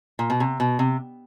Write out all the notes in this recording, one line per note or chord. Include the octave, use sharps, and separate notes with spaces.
A#2
B2
C3
B2
C3